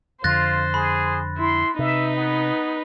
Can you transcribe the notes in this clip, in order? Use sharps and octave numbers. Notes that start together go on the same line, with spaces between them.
F2 D3 F4 C5 F#6 A6 A#6
G#4 B5
E4 C6
C3 D#4 B4 E5
B3